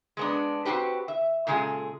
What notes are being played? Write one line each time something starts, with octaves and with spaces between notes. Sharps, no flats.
G#3 B3 D4
C4 F#4 G4 B4
E5
A#2 C#3 G#3 G#4 A4